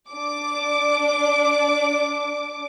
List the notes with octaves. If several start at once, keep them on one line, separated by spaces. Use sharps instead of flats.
D4 D6